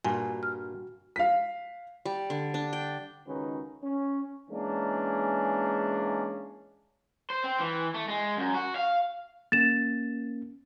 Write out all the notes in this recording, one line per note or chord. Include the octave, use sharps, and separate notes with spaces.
G2 A#2 F#4 G#5
F6
F5 B6
G3
D3
D4
G5
C#2 D#3 C#4 D#4 F#4 B4
C#4
E3 G#3 A#3 C#4 D4
C5
C4
E3
A3
G#3
F#2
F#4
F5
A#3 C#4 A6 E7